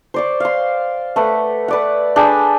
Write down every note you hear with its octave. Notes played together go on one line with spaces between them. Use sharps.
C5 D5 C#6
F5 C6
A3 B4 F#5
B4 D5 F#5
D4 G#4 G5 B5